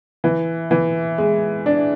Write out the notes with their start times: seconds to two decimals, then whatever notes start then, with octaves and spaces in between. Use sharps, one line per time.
0.24 E3
0.71 E3
1.18 G#3
1.66 D4